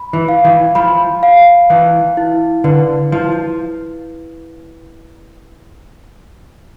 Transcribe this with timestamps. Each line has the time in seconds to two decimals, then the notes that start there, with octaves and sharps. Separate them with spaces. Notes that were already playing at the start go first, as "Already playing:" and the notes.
Already playing: B5
0.13 E3
0.29 F5
0.45 E3
0.75 F3 B5
1.23 F5
1.70 E3 E4
2.17 E4
2.64 D3 B4
3.12 F3 E4